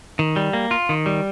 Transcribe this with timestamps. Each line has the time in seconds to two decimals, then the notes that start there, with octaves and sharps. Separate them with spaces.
0.19 D#3
0.36 G3
0.53 A#3
0.71 F4
0.89 D#3
1.06 G3